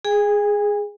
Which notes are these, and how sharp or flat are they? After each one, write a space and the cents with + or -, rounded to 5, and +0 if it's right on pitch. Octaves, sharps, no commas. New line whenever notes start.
G#4 +0 G#5 -40